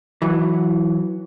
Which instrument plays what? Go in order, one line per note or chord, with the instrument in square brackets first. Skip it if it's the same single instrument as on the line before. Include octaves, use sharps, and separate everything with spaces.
[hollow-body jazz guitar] E3 F#3